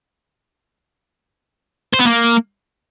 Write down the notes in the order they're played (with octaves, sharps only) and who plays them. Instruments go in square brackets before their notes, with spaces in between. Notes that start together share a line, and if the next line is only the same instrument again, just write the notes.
[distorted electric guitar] C5
B3
A#3